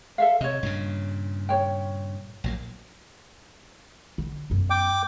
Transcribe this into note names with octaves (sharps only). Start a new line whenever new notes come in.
A4 E5 F5
C3 C#5 D#5
G2 A#2 C#3
C#5 G5
A#1 F#3 A#3
D3
F#2 B3
G5 D6